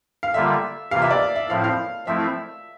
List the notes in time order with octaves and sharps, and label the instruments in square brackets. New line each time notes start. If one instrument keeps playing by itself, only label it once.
[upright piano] F5
[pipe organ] D3 G3 A#3 F4 [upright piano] E5
[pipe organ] C3 E3 A#3 F4 [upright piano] F5
[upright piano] E5
D5
E5
[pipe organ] A2 F3 C4 E4 [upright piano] F5
[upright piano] F5
[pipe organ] F3 A3 C4 E4 [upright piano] E5